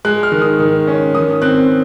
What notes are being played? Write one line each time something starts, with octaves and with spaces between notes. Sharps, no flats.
G#3 F#6
F6
D#3
D#6
D#3
C#4
D#3 D#6
C4 F#6